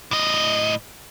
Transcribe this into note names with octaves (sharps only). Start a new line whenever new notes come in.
A2 D#5